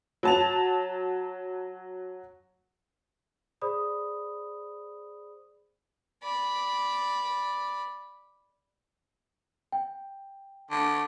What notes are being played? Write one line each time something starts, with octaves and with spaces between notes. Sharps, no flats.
F#3 A5 F7
G#4 C5 D5 B5 D#6
D5 B5
G5
D3